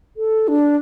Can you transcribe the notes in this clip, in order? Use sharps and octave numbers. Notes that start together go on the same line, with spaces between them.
A4
D4